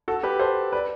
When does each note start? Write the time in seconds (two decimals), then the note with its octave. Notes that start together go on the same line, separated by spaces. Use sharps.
0.08 F#4 A4
0.23 G4 B4
0.39 A4 C5
0.73 B4 D5